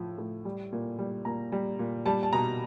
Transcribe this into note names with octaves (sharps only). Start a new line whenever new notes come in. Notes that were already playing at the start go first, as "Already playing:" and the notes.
Already playing: A2 F3
A2
G3
A#2
G3
A#2 A#5
G3
A#2
G3 A5
A5
B2 A#5